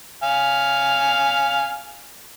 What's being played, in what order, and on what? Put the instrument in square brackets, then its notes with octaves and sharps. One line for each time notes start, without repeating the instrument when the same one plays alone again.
[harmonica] F5 G#5